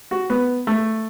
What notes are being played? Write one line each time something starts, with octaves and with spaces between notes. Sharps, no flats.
F#4
B3
A3